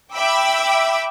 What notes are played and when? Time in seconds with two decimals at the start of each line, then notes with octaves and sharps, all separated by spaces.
0.15 E5 G5 B5 D6 E6